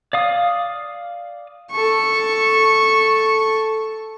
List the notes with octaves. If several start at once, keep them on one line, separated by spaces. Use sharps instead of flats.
D5 F5 D#6
A4 C#6